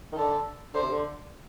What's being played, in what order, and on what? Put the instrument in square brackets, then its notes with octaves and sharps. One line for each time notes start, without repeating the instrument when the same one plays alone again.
[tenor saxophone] D#3
[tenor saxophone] D3 [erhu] A4
[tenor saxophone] D3 [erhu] C5
[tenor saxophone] C3
D3